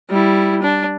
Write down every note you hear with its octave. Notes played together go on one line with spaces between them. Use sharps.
G3 E4
D4